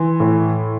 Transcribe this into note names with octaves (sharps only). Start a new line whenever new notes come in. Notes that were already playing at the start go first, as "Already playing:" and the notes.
Already playing: E3 C6
A2